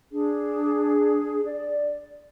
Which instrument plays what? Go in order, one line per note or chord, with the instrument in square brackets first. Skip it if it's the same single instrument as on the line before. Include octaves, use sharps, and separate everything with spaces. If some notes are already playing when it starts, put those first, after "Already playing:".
[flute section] D4 G#4
D5